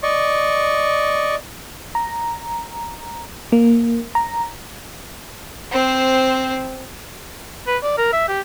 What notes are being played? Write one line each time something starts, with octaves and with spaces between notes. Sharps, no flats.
D5 D#5 C#6
A#5
A#3
A#5
C4 C5
B4
D5
A#4
E5
G4